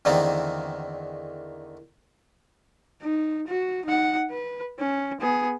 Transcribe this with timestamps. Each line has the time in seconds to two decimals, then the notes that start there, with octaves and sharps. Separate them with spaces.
0.05 E2 D3 D#3 A3 A#3 C4
3.02 D#4
3.47 F#4
3.85 D#4 F#5
4.31 B4
4.79 C#4
5.20 B3 G#4